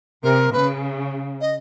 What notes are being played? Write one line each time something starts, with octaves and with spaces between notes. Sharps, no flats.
C3 A#4
C#3 B4
D#5